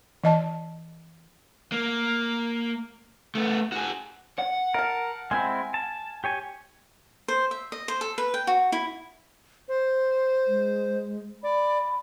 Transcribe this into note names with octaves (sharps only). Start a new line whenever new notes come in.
E3 D#5 A5
A#3
A3 B3
F#4 G#4
F#5
A#4 F5 A5
G#3 C4 E4 G#5
A5
G4 C#5 G#5
C5
E5
D#5
C5
A4
B4
G5
F#4
E4
C5
G#3
D5 B5